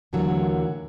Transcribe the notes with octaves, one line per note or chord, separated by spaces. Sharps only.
D#2 A2 D3 E3 F#3 A#3